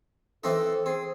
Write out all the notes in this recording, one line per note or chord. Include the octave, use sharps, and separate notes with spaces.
E3 C4 D#4 A4
C4 G#4